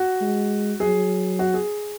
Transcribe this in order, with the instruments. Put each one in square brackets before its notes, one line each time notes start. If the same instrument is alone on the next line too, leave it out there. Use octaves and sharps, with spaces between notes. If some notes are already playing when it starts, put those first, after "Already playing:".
Already playing: [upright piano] F#4
[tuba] G#3
[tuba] F#3 [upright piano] G#4
[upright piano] F#4
G#4